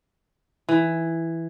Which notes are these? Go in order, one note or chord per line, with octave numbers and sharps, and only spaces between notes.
E3